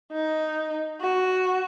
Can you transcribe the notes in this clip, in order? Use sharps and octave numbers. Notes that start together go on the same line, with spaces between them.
D#4
F#4